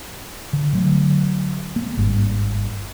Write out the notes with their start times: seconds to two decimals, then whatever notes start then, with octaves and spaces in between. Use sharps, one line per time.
0.53 D3
0.73 D3 F#3 A3
1.76 A#3
1.97 G#1 G2